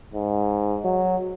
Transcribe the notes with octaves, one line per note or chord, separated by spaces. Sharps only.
G#2
F#3